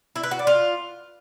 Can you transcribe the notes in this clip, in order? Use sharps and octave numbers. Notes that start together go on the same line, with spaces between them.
E4
B4
F#4
D5
F4